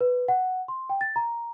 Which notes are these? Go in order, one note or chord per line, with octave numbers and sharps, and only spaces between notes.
B4
F#5
C6
G5
A6
A#5